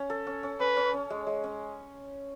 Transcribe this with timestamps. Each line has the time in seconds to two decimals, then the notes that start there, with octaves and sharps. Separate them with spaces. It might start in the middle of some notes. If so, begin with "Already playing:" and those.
Already playing: C#4
0.10 A4
0.27 C#4
0.43 C#4
0.60 C#4 B4
0.77 C#4
0.94 C#4
1.10 G#3
1.27 G#3
1.44 C#4